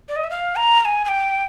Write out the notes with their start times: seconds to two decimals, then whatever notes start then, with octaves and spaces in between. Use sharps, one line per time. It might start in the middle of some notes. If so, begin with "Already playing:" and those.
0.09 D5
0.16 D#5
0.24 E5
0.30 F5
0.56 A#5
0.80 A#5
0.85 G#5
1.05 G#5
1.09 G5